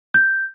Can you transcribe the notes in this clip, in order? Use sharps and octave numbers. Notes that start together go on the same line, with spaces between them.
G6